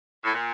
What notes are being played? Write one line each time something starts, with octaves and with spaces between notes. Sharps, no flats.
A2
A#2